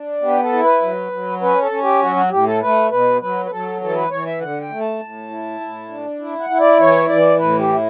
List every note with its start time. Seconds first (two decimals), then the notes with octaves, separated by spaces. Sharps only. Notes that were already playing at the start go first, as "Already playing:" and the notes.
Already playing: D4
0.22 B3 G4
0.43 A4
0.53 E4
0.63 B4
0.82 F#3
1.12 F#3
1.41 C#4 B4
1.61 A4
1.71 C#4
1.82 G4
2.01 F#3 F#4
2.16 F#4
2.31 A2 G4
2.46 A4
2.62 A3 B4
2.91 B2 B4
3.21 F#3 B4
3.45 B4
3.51 F#3 A4
3.81 E3 A4
3.96 B4
4.11 E3 C#5
4.26 E5
4.41 D3 F#5
4.61 G5
4.70 A3
4.81 A5
5.00 A2
5.30 E4
5.60 A2
5.89 D4
6.19 E4
6.40 F#5
6.50 E4
6.60 D5
6.79 E3 C#5
7.09 E3 D5
7.39 A2 B4
7.59 G4
7.69 E4